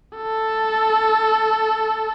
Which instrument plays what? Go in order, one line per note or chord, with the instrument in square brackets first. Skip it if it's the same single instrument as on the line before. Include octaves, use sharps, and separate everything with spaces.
[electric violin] A4